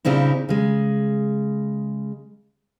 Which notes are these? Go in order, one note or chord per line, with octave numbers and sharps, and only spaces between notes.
A#2 C#3 C4 D#4 E4
C#3 G#3